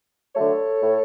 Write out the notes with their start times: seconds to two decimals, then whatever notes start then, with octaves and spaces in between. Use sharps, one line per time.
0.35 D3 F#3 A3 A4 C#5
0.80 A2